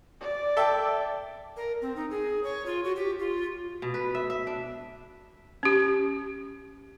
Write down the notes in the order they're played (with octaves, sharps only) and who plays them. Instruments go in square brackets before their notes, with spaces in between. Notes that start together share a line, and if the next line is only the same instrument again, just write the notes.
[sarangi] D5
[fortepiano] A4 E5 G5
[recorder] A#4
C4
D#4
G#4
C#5
F4
F#4
G4
F4
[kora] B2
B4
E5
E5
D4
[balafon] C#4 G4